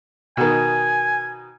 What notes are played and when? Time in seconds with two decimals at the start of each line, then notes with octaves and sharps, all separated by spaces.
0.37 B2 D#3 G#5